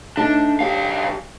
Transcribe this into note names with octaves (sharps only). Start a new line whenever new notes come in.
A3 D4 D#4
B1 D4 G4 F5